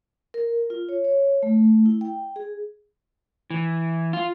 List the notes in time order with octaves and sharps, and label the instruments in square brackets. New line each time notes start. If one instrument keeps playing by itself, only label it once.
[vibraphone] A#4
F4
C#5
C#5
A3
E4
G5
G#4
[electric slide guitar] E3
F4